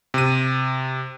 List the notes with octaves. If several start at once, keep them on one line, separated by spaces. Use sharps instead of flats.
C3 D#7